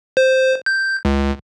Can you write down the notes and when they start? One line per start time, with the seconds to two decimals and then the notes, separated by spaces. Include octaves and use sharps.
0.17 C5
0.66 G6
1.05 C#2